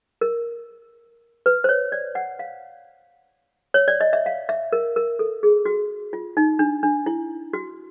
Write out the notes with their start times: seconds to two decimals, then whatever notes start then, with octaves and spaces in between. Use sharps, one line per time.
0.21 A#4
1.46 B4
1.64 C5
1.69 C#5
1.92 D5
2.15 F#5
2.39 F5
3.74 C#5
3.88 D5
4.01 D#5
4.13 E5
4.26 F5
4.49 E5
4.72 A#4
4.96 A#4
5.19 A4
5.43 G#4
5.66 F#4
6.13 F4
6.37 D#4
6.59 D4
6.83 D4
7.06 E4
7.53 F#4